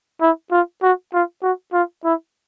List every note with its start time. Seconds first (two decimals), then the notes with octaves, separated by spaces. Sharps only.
0.21 E4
0.51 F4
0.82 F#4
1.13 F4
1.42 F#4
1.73 F4
2.04 E4